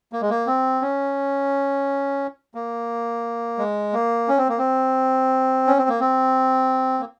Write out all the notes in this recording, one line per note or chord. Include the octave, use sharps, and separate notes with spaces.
A#3
G#3
A#3
C4
C#4
A#3
G#3
A#3
C#4
C4
A#3
C4
C#4
C4
A#3
C4
A#3